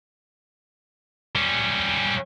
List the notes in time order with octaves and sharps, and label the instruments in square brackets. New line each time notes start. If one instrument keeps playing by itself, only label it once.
[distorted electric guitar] G3 C#4